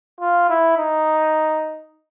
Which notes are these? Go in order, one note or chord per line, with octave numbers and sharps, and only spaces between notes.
F4
E4
D#4